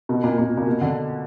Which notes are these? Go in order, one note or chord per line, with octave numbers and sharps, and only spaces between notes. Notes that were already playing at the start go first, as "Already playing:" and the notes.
B2
A#2
A#2
A#2
B2
D3